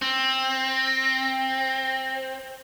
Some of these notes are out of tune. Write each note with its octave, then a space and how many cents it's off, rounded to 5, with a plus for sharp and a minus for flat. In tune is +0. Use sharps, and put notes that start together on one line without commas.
C4 +15